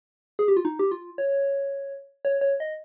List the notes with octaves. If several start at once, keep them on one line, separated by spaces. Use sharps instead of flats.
G#4
G4
F4
D#4
G4
F4
C#5
C#5
C#5
D#5